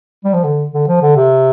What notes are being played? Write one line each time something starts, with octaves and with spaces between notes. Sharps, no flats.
G3
F3
D3
D3
F3
D3
C3